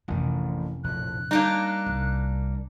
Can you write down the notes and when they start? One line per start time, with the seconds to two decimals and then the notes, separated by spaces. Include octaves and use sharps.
0.08 A1 F2 C3 D#3
0.84 A#1 A2 F#6
1.31 G3 A#3 D4 D#4
1.86 C2